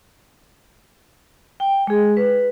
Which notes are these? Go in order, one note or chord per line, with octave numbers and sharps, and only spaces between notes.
G5
G#3 G#4
B4